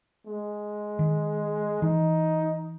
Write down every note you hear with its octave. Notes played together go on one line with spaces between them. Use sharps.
G#3
D#3
E3 D#4